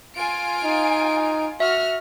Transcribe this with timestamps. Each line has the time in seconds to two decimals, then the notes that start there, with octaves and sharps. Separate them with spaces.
0.18 F4 G#5 D7
0.64 D#4
1.60 F#4 E5 F6